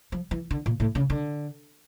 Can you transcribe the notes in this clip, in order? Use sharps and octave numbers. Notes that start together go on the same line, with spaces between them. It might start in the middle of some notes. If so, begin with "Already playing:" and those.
F3
E3
D3
A#2
A2
C#3
D3